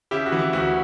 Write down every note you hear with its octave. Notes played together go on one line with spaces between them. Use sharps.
C#3 E4 G4
F#4
E3
E4
D2 F#4